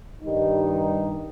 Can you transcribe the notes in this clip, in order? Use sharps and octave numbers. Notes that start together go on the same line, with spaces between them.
G2 D#3 G3 D#4